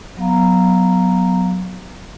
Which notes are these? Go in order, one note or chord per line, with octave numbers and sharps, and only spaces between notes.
F#3 B3 F5 A#5